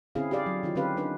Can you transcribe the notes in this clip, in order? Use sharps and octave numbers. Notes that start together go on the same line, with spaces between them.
D3 C4 C#4 E4 G#4 F5
G4 G#4 D5 F5
F#3
D#3 D#4 F4
D3 C4 C#4 G4 B4 F5
D4 D#4 B4